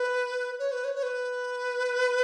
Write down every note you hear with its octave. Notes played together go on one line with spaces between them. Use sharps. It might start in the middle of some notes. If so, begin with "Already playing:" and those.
Already playing: B4
C#5
B4
C#5
C#5
B4